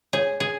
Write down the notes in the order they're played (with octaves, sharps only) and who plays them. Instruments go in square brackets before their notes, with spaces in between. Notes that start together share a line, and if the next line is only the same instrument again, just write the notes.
[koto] G#4 [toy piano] C#5
[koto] G#4